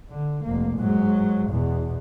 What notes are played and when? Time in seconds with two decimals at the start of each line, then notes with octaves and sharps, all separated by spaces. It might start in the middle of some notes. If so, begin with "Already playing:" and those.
0.10 D3
0.44 F1 A#3
0.78 G#2 F#3
1.49 E2 B2